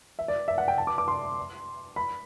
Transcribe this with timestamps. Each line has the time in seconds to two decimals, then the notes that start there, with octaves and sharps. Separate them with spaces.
0.19 E5
0.28 D5
0.48 E5
0.58 F#5
0.68 G5
0.78 A5
0.87 D6
0.98 D6
1.08 C6
1.96 B5